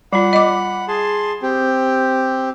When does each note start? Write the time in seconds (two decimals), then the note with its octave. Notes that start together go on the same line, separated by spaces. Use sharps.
0.13 G3 F4 F#5 B5
0.33 D#5 D6
0.88 G#4 A5 C6
1.42 C4 G4